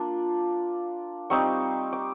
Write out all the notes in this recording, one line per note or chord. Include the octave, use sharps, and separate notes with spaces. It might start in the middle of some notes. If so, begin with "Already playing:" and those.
Already playing: A#3 D4 F4
G3 C4 D#4 C#6
D6